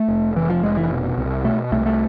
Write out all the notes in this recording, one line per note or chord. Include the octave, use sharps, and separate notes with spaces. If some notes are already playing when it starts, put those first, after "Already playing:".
Already playing: A3
F1
F1 E3
F3
F1 G#3
E3
B2
C2
B2 A3
C2 A3
A3